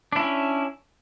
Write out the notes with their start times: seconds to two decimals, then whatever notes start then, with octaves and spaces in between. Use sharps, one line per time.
0.12 D4
0.16 E4
0.20 C#4